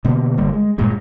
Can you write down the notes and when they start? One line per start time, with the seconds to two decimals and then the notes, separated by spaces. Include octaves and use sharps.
0.05 B2 D3 A#3 B3
0.38 G#1 D3 G3 A#3
0.53 G#3
0.78 D1 G2 A#2 G#3